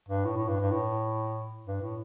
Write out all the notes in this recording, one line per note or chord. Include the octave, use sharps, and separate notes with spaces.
G2
A2
A2
G2
G2
A2
G2
A2